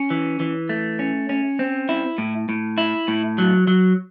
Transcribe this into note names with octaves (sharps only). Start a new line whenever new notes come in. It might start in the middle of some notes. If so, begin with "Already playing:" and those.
Already playing: C#4
E3
E3
A3
C#4
C#4
C4
E4
A2
A2
E4
A2
F#3
F#3